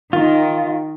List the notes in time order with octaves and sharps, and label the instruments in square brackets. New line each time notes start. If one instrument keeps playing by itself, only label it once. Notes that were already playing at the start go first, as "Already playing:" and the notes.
[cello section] D#3 [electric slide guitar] F4